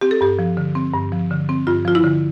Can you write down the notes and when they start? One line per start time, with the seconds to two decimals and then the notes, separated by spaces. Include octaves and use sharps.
0.01 C4 G4
0.11 A4
0.21 G2 G4
0.39 F3
0.57 D3
0.75 C4
0.94 G2
1.12 F3
1.31 D3
1.49 C4
1.67 G2 F4
1.85 F3 F4
1.95 E4
2.04 D3